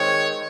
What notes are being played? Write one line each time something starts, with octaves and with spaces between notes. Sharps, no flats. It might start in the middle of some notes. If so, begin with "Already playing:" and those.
Already playing: D#3 G#3 C4 C#5